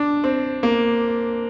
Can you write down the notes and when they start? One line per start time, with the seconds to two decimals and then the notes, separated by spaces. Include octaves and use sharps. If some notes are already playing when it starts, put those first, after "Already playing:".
Already playing: D4
0.24 C4
0.63 A#3